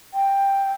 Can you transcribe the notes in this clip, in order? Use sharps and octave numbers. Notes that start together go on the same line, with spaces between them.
G5